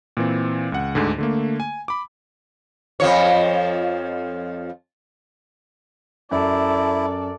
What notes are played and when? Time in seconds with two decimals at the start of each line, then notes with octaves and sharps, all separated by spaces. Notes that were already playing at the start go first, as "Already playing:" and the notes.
0.17 A#2 E3 C4
0.72 C#2 F#5
0.95 D2 G#2 D3
1.18 D3 A3 A#3
1.60 G#5
1.88 B5 D6
3.00 F2 F3 C#5
6.31 F#2 E4 A4 D5